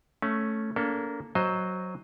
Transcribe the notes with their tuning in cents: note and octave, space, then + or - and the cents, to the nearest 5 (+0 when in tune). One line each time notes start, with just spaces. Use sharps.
A3 +0 C#4 +0
A#3 +0 D4 -45 A4 +0
F#3 +0 C5 +10 D#5 +0